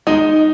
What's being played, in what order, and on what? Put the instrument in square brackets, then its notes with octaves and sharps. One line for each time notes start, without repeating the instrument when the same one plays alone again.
[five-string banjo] G#3 [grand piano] D#4